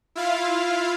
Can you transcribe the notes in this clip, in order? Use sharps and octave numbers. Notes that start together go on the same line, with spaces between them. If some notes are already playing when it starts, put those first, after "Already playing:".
E4 F4 F5